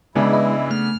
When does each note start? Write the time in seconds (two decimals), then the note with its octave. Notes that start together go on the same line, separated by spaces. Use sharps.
0.15 C#3 E3 G#3 B3 D4 E4
0.33 D#5
0.71 A3 F6